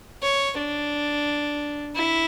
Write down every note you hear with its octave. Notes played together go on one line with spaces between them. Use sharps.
C#5
D4
E4